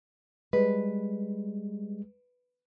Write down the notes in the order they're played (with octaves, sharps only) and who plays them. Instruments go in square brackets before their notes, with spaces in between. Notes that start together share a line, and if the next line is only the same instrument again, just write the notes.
[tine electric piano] G3 G#3 [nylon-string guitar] B4